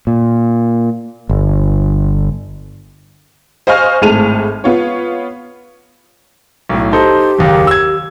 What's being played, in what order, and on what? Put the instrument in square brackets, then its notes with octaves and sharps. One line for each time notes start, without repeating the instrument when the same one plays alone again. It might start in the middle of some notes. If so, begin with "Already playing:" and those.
[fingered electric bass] A#2
G1
[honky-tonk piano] C5 D#5 F5 G#5 C#6 F6
G#1 A2 G#4 A5 D#7 F7
B3 F4 C#5
[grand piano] B1 A2
[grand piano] D#4 A4 C5 [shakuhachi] G4
[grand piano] F#1 D#2
E6 G#6